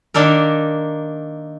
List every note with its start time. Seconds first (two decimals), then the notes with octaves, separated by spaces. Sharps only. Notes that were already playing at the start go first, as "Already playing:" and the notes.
0.14 D#3 A#3 D4 A4 A#4